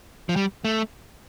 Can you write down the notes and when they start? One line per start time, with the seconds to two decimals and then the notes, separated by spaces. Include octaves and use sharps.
0.29 F3
0.36 G3
0.65 A3